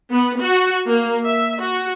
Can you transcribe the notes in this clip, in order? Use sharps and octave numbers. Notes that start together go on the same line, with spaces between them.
B3
F#4
A#3
E5
F#4